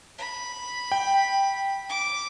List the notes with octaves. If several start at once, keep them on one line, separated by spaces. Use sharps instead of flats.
B5
G5
D6